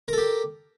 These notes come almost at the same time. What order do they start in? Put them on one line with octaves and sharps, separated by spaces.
A#4 A4 G4